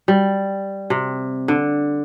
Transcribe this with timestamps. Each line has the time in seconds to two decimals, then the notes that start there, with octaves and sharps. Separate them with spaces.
0.08 G3
0.90 C3
1.48 D3